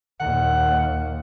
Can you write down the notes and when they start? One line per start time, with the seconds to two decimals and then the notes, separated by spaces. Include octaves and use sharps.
0.20 D#2 A#2 F#5